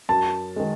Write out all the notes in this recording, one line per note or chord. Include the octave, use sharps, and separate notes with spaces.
F#2 A5
D#3 G#3